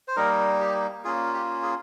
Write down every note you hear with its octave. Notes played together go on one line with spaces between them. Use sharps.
C5
G3 A#3 D#4 A#4
G4
A#3 C#4 F4 G#4
G4
G#4